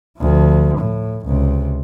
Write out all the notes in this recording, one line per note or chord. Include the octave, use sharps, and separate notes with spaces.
D2 F3
A2
C#2 C3